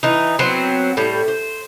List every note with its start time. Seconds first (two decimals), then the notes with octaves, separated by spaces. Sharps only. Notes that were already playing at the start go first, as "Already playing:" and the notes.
0.03 E3 D#4
0.39 F#3 B3 C4
0.97 A2 G3
1.28 C5